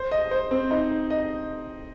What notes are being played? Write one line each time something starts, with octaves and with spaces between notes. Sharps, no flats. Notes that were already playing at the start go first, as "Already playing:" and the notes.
Already playing: C5
D#5
C5
C4
D#4
D#5